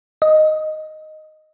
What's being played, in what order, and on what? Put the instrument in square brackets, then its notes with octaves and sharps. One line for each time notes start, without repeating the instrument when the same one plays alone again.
[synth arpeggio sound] D#5